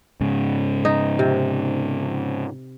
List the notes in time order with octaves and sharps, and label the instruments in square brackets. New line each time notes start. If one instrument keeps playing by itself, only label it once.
[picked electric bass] G#2 C#3
[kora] D#4
C3